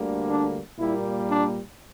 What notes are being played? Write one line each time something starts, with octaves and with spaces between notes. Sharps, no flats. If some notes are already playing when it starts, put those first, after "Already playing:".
Already playing: D2 D3 G3 A#3
D4
A#2 G3 A#3 E4
D4